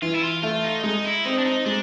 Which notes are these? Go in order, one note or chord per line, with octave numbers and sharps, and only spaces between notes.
E3 F4
E4
F4
A3 F4
D#4
G#3 D#4
E4
C4 D#4
D4
D#4
G#3 D4